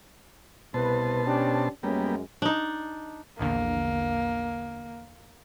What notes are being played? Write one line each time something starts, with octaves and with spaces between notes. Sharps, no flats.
C2 B2 B4 C5 A5
C#4 D4 G4
F#2 G3 G#3 A#3 B3 C#4
D4 D#4
A#1 E2 D3 A#3